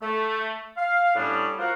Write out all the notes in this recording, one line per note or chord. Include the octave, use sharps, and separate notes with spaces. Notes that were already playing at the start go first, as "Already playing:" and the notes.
A3
F5
A2 G3 B3 C#4 D4
F4 F#4 A#4 C5 F5 F#5